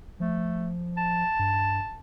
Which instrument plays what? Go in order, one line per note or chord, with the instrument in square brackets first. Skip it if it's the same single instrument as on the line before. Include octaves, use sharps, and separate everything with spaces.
[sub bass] F3 [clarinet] A3
[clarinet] A5
[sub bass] G2